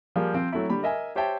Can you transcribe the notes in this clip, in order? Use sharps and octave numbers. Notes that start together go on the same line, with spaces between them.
F3 G3 A#3 G#4
F3 C4
F#3 A3 C4 E4
D3 G3 B5
A#4 D#5 E5 G#5
G4 C5 C#5 E5 G5 A5